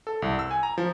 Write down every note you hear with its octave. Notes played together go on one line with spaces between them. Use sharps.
A4
C2
E6
G#5
A#5
F3